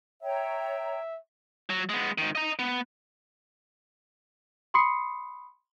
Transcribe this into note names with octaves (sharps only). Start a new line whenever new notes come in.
C#5 E5 G5 A#5
F#3
G#3 B3
G#2 D#3
D#5 A#5
B3
B5 C6 D#6 C7 C#7